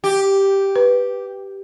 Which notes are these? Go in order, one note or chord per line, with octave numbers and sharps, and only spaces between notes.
G4
B4